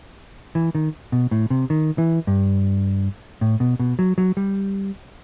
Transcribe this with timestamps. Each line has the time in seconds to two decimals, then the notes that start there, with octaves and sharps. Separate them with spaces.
0.55 E3
0.75 D#3
1.12 B2
1.31 A2
1.50 C3
1.70 D#3
1.98 E3
2.27 G2
3.41 A2
3.60 B2
3.79 B2
3.99 F#3
4.18 F#3
4.37 G3